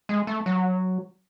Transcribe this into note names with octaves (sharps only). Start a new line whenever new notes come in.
G#3
A3
F#3